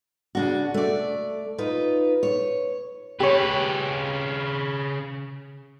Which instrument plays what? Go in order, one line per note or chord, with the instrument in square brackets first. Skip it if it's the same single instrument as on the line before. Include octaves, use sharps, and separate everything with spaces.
[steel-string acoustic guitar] C#3 D4 F#4
A3 D5
D#4 F4 B4
C#5
[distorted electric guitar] C#3 B4 [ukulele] G4 C#5